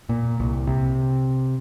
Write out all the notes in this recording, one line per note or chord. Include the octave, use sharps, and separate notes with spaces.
A#2
C2
C3